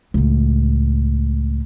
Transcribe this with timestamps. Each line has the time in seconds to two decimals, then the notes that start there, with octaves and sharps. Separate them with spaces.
0.14 C#2 A2